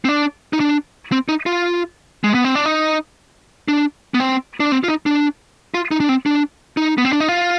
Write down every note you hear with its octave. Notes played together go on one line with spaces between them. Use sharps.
C4
D4
D#4
D4
C4
D#4
F4
G#3
B3
C4
D4
D#4
D4
B3
C4
D4
C4
F4
D#4
D4
F4
D#4
D4
C4
D4
D#4
B3
C4
D4
D#4
F4